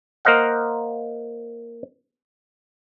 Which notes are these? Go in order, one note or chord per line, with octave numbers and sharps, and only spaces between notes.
A#3 A#4 C5 D#5 F5 F#5